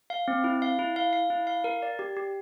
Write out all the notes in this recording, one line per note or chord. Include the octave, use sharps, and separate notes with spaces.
F5
C4
E4
F5
E4
F5
F5
E4
F5
A#4
D5
G4
G4